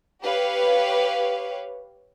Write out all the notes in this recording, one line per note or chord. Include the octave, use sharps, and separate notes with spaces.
G4 B4 C#5 F5